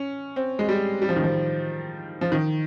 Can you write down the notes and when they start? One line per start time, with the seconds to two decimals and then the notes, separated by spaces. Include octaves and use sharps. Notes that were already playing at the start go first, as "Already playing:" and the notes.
Already playing: C#4
0.36 C4
0.59 G#3
0.69 G3
1.02 G3
1.09 F3
1.16 D#3
1.23 F3
2.21 F3
2.32 D#3